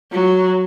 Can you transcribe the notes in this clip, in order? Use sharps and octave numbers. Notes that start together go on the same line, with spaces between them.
F#3